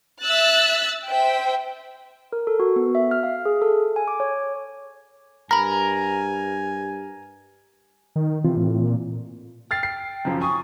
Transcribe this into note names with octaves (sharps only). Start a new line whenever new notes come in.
E5 E6 F#6 A6
C5 E5 G5
A#4
A4
F#4
B3
E5
F6
F5
G#4
A4
G#5
D6
C#5
G2 A#4 G#5 A#5 B5
D#3
C3 E3 C4 F4
A2
A#2
G5 F6 A6 C7
C7
F#2 C#3 F3
G#5 C#6 D#6